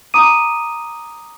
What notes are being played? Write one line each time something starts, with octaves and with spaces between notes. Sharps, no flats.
A#5 D6 D#6 D#7